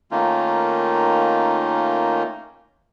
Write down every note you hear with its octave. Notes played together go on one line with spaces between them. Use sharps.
D#3 A3 A#3 C#4 D#4 F4